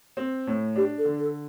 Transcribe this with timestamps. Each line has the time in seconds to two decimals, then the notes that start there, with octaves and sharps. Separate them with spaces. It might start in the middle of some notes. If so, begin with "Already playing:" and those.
0.17 C4
0.47 A2
0.76 D4 G4
0.98 A4
1.05 D3
1.19 A4